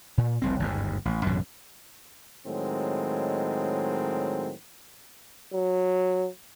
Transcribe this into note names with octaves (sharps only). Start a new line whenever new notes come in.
A#2
F1 C2 C4
G1 D#2 G#2
A1
A1 F#2 B2 D3
A2 D#3 F#3 G#3 C4
F#3